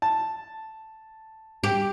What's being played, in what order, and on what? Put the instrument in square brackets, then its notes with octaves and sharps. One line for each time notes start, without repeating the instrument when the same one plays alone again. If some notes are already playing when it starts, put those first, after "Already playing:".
[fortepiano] A5
[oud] G4